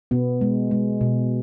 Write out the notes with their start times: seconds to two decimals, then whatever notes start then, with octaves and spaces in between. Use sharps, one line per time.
0.11 B2 B3
0.41 G#3
0.71 G#3
1.01 B2